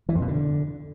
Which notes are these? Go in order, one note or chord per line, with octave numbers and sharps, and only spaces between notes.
E3
F2
B2
D3